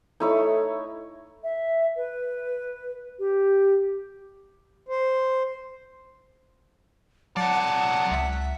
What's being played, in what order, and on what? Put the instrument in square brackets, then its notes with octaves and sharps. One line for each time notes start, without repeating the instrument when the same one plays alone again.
[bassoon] A3 [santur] D#4 E4 C#5
[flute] E5
B4
G4
[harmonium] C5
[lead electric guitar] C3 D5 [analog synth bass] F#3 [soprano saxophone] F#5 [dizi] A5
[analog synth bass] C#2 [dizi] E5